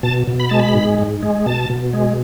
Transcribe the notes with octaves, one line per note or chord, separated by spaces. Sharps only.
B2 A5
B2
B5
G#3 A5
B5
G#2
G#2
G#3
B2 A5
B2
G#3